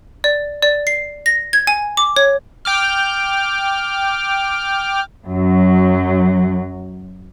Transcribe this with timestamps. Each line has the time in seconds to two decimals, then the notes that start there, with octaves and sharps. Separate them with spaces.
0.24 D5
0.63 D5
0.87 C7
1.26 A#6
1.53 G#6
1.67 G#5
1.97 D6
2.16 C#5
2.65 G5 D6 F6
5.28 F#2 F#3